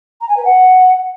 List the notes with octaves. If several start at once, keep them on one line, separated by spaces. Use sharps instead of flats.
A#5
G#5
B4
F#5